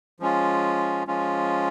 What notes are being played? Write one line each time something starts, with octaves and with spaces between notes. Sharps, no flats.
F3 G#3 C#4 F4
F3 G#3 C#4 F4